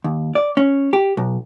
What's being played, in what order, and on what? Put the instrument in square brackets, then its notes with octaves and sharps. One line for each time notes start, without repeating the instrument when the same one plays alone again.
[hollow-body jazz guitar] D#2
D5
C#4
G4
B1